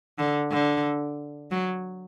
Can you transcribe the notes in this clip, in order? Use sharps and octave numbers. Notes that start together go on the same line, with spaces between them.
D3
D3
F#3